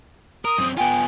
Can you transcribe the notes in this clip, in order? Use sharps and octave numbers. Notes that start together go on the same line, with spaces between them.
A#4 D#6
F#2 C4
B3 F4 G5 G#5